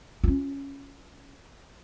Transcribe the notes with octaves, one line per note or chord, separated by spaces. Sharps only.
C#4 F4